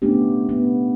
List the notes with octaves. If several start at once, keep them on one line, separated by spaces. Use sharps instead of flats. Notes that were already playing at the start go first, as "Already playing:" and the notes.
A3 B3 C#4 D4 G4
B3